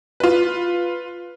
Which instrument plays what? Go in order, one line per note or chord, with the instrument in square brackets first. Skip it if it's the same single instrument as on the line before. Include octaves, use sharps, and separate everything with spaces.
[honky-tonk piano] F4 B4